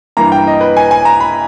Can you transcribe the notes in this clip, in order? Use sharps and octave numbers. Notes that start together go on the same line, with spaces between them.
G2 E3 A#3 A#5
G5
D#5
B4
G#5
G#5
A#5
B5